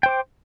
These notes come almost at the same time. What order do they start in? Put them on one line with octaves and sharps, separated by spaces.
G5 C5 D6